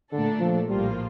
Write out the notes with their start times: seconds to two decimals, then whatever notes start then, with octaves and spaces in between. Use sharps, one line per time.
0.12 A#2 D3 A3 D4 A4
0.40 F3
0.68 A#1 A2 F3 G3 A#3 F4